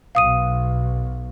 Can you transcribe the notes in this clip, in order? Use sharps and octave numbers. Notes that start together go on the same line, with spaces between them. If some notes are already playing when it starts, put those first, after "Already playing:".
B1 F5 D#6 D#7